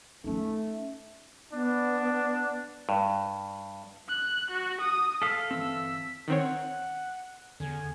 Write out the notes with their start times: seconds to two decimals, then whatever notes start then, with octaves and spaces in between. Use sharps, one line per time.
0.24 A3 C#4 D#4
1.53 B3 D4
2.89 G2
4.09 F#6
4.51 F#4
4.81 D#6
5.22 A4 F5 B6
5.51 G1 E3 C4 E6
6.28 D#3 C4 C#5 F#5
7.60 E2 D3 G#5